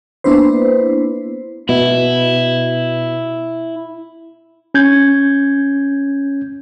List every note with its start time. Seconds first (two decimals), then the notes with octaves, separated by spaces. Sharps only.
0.24 A#3 B3 D4 E4 B4 C5
1.69 B2 E4
4.74 C#4 G6 G#6